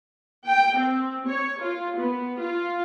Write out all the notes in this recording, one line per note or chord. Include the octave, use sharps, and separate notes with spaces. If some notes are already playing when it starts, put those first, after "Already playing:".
G5
C4
C#5
F4
B3
F4